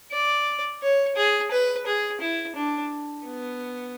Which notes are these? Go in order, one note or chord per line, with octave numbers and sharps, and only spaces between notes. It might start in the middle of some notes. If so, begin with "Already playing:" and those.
D5
C#5
G#4
B4
G#4
E4
D4
B3